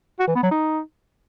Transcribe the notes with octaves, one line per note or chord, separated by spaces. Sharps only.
F#4
E3
B3
F#3
D#4